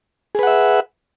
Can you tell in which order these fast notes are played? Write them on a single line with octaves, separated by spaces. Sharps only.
G#4 B4 F#5 E5